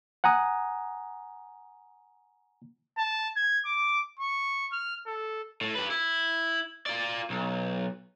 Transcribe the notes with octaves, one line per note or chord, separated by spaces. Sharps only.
F#5 G#5 A#5 D#6
A5
G#6
D6
C#6
F6
A4
A2
G4 B4
E4
F4 D5
B1